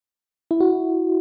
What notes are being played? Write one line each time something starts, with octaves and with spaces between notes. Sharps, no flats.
E4
F#4